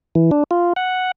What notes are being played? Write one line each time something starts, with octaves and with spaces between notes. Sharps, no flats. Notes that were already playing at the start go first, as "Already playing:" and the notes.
E3
D4
F4
F#5